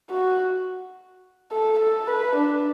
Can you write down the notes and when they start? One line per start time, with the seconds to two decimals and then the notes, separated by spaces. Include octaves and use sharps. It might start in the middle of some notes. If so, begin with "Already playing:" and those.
0.10 F#4
1.51 A4
1.79 A4
2.07 B4
2.35 D4